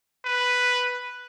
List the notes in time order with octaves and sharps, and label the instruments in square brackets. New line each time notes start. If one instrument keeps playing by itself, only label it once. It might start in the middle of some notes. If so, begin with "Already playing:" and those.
[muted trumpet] B4